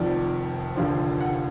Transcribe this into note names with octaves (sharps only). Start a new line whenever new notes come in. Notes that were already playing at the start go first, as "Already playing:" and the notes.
Already playing: F1 F2 D#3 D5
F1 D#2 D3 F3
F#5